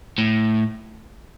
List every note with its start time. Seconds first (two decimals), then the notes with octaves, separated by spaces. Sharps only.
0.18 A2